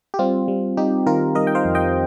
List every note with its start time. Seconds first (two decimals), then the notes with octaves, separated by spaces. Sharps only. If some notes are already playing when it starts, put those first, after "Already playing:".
0.14 G4
0.19 G3 C4 F4
0.48 G3
0.77 G3 D#4 G4
1.06 D#3 F4 A#4
1.35 G3 A#4 D#5
1.47 G5
1.55 C5 F5
1.65 F2
1.75 D#5 G5